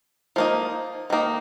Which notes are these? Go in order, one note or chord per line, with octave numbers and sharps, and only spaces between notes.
F3 A#3 D#4
D#3 A#3 D#4